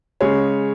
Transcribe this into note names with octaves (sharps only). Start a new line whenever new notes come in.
C#3 G#3 C#5